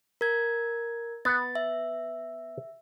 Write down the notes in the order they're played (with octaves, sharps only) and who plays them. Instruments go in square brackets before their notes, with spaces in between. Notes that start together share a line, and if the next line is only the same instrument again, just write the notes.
[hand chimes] A#4 G#6
[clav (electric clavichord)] B3 F#5 [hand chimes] A6
[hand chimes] E5